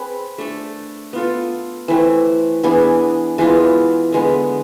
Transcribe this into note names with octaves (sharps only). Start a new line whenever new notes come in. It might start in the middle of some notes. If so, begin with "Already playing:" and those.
Already playing: C4 G#4 B4
A3 D4 A4
B3 F4 A4
E3 A3 C4
E3 B3 D4 G#4
E3 G#3 B3 F4
D3 G#3 B3